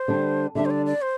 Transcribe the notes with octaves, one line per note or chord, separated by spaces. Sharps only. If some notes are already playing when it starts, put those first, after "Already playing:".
Already playing: C5
D3 G3 D4
D3 G3 D4 E5
C5
D5
D5
C5